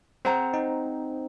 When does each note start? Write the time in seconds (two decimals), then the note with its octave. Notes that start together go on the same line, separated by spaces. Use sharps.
0.25 C4 G#4 C5 F#5 A#5
0.54 D#4